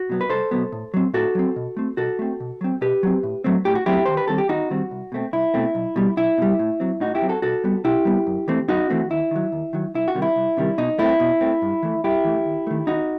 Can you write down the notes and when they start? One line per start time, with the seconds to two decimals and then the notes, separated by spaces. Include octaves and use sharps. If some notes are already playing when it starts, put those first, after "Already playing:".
Already playing: F#4
0.10 B2 F#3 B3
0.21 B4
0.30 C2 A4 C5
0.51 B2 F#3 B3
0.72 A2
0.94 F#3 C4
1.14 A2 F#4 A4
1.35 F#3 C4
1.56 B2
1.77 A3 C4
1.97 B2 F#4 A4
2.19 A3 C4
2.40 B2
2.61 F#3 C4
2.81 B2 G4 B4
3.03 F#3 C4
3.23 A2
3.44 F#3 A3 C4
3.65 A2 G4
3.75 F#4
3.86 F#3 A3 C4 E4 G4
4.06 D#2 C5
4.17 B4
4.28 D#3 G3 C4 A4
4.38 G4
4.49 D#2 D#4 F#4
4.70 D#3 G3 C4
4.91 C2
5.12 B2 A3 C4
5.33 C2 E4
5.54 B2 A3 C4
5.75 B1
5.96 B2 G3
6.17 B1 E4
6.38 B2 G3
6.59 A2
6.80 F#3 C4
7.00 A2 D#4 F#4
7.15 E4 G4
7.22 F#3 C4
7.29 F#4 A4
7.42 B2 F#4 A4
7.64 G3 B3
7.84 B2 E4 G4
8.05 G3 B3
8.27 F#2
8.48 E3 A3 C4
8.68 F#2 D#4 F#4
8.90 E3 A3 C4
9.10 D#2 E4
9.31 D#3 F#3
9.52 D#2
9.73 D#3 F#3
9.95 C2 E4
10.08 F#4
10.15 C3 D#3 G3
10.22 E4
10.36 C2
10.57 C3 D#3 G3
10.78 B2 D#4
10.99 A3 C4 E4
11.20 B2
11.41 A3 C4
11.62 G2
11.83 E3 A3
12.04 G2 E4 G4
12.24 E3 A3
12.45 D#2
12.67 D#3 A3
12.87 D#2 D#4 F#4